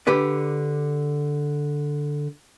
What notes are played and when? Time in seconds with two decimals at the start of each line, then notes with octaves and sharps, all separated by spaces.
0.07 D3 G4 B4 D5